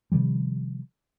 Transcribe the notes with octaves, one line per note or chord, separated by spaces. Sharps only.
C3 D#3 F3 G3